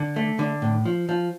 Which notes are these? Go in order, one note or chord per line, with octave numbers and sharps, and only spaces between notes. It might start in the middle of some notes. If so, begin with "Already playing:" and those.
Already playing: D3
A3
D3
A2
F3
F3